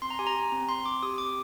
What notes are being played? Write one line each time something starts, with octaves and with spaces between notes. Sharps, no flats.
C4 C6
A#5
G4 G#5
A#5
G4
C4
C4 C6
C4 D6
G4 D#6
C4 D6